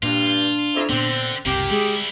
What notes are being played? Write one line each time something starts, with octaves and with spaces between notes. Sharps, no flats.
G2 A#2 D4 F4
F2 E4
A#2 D3 B3 C4
F#1 C2 A#2 A#3 C4 G4
G3 G#3 E4 G#4